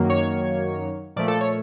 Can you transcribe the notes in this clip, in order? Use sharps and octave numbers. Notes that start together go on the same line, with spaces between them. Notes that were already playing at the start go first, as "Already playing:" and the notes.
Already playing: F#2 D#3 F#3 A#3
C#5
A#2 F3 A3 D5
A4
C#5